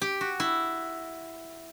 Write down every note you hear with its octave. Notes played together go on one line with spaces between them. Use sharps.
G4
F#4
E4